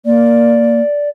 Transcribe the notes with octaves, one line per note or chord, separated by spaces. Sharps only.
A#3 D5